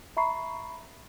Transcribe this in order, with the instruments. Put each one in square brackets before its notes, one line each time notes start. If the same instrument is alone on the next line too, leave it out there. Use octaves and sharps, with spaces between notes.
[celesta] E5 A#5 B5 C#6 C7